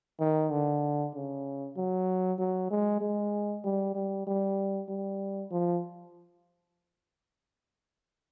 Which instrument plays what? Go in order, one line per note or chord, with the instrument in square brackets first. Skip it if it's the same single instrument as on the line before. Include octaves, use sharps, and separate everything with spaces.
[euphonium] D#3
D3
C#3
F#3
F#3
G#3
G#3
G3
G3
G3
G3
F3